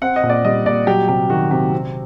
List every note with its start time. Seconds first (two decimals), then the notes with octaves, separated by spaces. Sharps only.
0.02 C4 F#5
0.16 D#5
0.23 A#2
0.30 D5
0.44 G3 D#5
0.66 A#2 D5
0.87 F#3 G4
1.08 C3 G4
1.30 D#3 F#4
1.51 C3 G4
1.72 C4